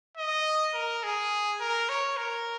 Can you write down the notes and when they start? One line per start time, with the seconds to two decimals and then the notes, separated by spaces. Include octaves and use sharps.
0.17 D#5
0.74 A#4
1.03 G#4
1.60 A#4
1.89 C#5
2.17 A#4